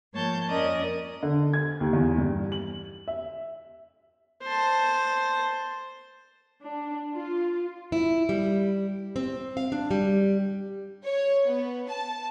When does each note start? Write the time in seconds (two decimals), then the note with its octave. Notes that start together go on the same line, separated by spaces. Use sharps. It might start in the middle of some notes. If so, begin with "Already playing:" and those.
0.12 G#2 F3 A#3 C#5 A5 G6
0.48 F2 C#4 A#4 D5 D#5 D#6
1.23 D3
1.53 G#6
1.81 D#2
1.93 E2
2.18 G2
2.52 F#7
3.08 E5
4.43 C5 A5
6.61 D4
7.14 F4
7.92 E4
8.29 G3
9.16 C4
9.57 F5
9.72 D4
9.91 G3
11.04 C#5
11.46 B3
11.87 A5